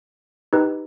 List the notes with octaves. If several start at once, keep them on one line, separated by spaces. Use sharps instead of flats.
D#4 G4 B4